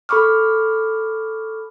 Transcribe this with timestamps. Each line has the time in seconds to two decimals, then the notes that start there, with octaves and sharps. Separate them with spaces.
0.09 A4 B5 C#6 D6 F6